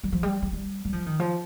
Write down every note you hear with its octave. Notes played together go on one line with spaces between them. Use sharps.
G3
F3
G3
G3
G3
G3
F3
D#3
F3